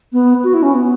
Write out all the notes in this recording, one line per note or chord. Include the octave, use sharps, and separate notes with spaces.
B3
F#4
E4
C#4
B3